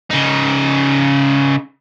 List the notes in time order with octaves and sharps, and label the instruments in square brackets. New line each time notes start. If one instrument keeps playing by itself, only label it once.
[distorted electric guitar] C#3 D#4